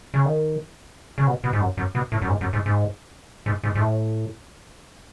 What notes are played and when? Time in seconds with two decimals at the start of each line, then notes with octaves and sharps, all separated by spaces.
0.14 C#3
0.25 D#3
1.18 C#3
1.27 B2
1.44 B2
1.53 G#2
1.61 F#2
1.77 F#2
1.95 B2
2.12 A2
2.22 F#2
2.29 G#2
2.41 F#2
2.53 G#2
2.66 G#2
3.46 G#2
3.63 G#2
3.75 G#2
3.80 A2